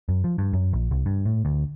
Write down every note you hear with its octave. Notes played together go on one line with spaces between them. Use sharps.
F#2
F3
G2
F#2
A#1
C2
G2
A2
D2